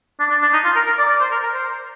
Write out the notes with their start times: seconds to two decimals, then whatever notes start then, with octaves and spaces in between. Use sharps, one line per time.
0.20 D4
0.30 D4
0.42 D4
0.53 D#4
0.64 F4
0.76 A#4
0.87 A#4
0.98 D5
1.09 D5
1.21 C5
1.32 A#4
1.43 A#4
1.54 C5